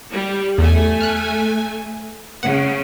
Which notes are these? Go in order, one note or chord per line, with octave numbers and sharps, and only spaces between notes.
G3
E2 A3 G#5
F6 F#6
C#3 F#5